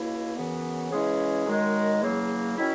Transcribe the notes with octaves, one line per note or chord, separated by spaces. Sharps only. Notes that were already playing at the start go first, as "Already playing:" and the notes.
Already playing: C#2 B2 A#3 E4
F#2 C#3 E3 B3
C#3 E3 G#3 C#4 G#4
F#2 D#3 G#3
E2 C#3 F#3 A#3
D#3 F#3 C#4 E4